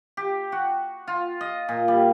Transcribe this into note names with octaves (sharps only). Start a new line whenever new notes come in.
G4
F#4
F4
D#5
A#2
G3